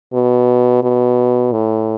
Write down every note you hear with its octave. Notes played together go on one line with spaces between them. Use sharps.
B2
B2
A2